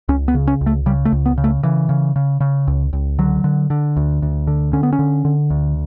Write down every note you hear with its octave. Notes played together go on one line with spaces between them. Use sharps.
C#2 C#4
B3
C#3
C#4
C#2
A3
C#3 G3
A3
C#2
B3
C#3
A3
C#3 E3
C#3
C#3
C#3
C#2
C#2
D3 F#3
D3
D3
D2
D2
D3
D3 C#4
B3
C#4
D3
D3
D2